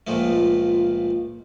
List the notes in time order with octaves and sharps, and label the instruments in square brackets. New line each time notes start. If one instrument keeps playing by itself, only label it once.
[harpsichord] C#2 A#2 F3 A3